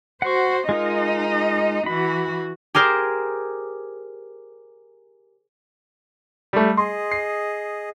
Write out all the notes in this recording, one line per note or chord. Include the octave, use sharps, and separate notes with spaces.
F#4 C5 F#5 C#6
G#3 D#4 F4 A#4 D#5
E3 F#4 B5
G4 G#4 A#4 C5
G3 A3
G#4 D#5 C6
C7